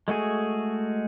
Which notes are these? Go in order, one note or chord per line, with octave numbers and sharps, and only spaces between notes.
G#3 A3 F#4 G#4